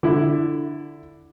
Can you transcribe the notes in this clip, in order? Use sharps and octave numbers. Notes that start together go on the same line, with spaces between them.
D3 E4